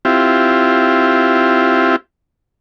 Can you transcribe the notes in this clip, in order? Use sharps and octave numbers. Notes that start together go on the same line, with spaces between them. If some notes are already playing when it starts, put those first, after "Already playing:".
C4 E4 F4 G4